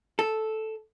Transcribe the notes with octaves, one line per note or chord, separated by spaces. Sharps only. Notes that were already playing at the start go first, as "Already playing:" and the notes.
A4